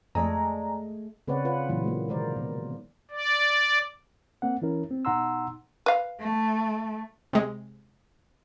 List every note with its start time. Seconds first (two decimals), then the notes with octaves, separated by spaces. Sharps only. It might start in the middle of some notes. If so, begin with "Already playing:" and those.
0.15 F2 G#3 A3 D5 G#5 A#5 D#6
1.28 C#3 C4 B4 C#5 D5 F#5
1.45 C#4 F4 B4 F#5
1.69 A#2 E3 F#3
1.84 G#3 A#3
2.08 C3 D#3 G#3 A#4 C5 D5
2.36 B2
3.11 D5
4.42 A#3 C4 F#5
4.62 E3 C#4 E4 A#4
4.91 C4
5.05 B2 D#4 F#5 A#5 C6 E6
5.86 B4 F5
6.19 A3
7.33 C3 G#3